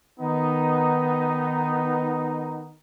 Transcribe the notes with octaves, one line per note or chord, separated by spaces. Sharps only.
D#3 B3 D#4